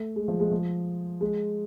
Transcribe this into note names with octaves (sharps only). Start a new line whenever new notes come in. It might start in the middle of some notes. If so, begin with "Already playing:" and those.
Already playing: A3
G#3
F3
G#3
F3
G#3